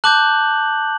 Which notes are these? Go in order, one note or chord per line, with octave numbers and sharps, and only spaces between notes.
A5 D6 F#6 G6 F#7